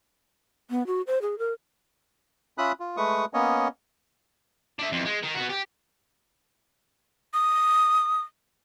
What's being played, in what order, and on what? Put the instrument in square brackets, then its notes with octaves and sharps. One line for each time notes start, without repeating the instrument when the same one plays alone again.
[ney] B3
F#4
C5
G#4
A#4
[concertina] C#4 F4 E5 B5 D#6 F#6
F4
G#3 A3 B4 C#6 D#6
A#3 B3 C#4 C#5 D#5
[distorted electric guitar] D4 E5
F2 E3
G#3
D#3
B3 F#4
G4
[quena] D#6